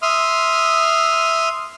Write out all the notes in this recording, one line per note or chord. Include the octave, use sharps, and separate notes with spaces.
E5 C6 D#6 F6